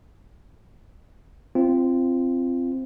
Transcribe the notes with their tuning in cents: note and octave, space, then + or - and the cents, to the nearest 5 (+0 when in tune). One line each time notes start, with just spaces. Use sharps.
C4 +0 F4 -20